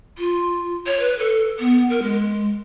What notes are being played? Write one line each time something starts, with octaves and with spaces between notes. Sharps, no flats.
F4
C#5
B4
A4
B3
A#4
G#3